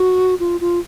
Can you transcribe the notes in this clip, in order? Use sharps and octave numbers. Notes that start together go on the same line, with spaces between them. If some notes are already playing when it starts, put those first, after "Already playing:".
Already playing: F#4
F4
F4